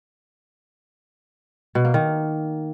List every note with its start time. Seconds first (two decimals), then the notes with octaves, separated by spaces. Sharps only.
1.75 B2
1.85 A#3
1.94 D#3